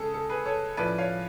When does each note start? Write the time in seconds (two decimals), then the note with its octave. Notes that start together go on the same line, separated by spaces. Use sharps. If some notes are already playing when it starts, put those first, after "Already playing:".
Already playing: C#3 G#3 C#4 G#4 A4
0.14 A4
0.29 G#4 B4
0.45 A4 C#5
0.77 A2 F3 A3 C#4 B4 D5
0.98 C#5 F5